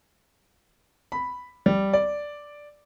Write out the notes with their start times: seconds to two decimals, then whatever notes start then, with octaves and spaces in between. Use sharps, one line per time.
1.12 B5
1.66 G3
1.93 D5